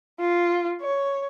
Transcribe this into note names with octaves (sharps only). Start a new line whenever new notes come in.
F4
C#5